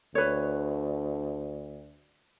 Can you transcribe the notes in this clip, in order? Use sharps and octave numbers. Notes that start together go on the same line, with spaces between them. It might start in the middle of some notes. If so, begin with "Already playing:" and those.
D2 B4 C#5